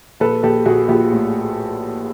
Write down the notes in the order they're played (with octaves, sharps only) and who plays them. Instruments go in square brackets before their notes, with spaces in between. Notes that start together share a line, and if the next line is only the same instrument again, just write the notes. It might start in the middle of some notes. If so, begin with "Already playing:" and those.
[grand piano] A#1 A4 B4
A#1 G4 A4
A#1 F#4 G#4
A#1 F4 G4
A2